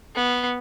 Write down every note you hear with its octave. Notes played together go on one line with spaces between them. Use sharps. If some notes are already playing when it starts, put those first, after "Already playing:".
B3